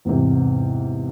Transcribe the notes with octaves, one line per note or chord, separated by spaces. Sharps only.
E2 G#2 C3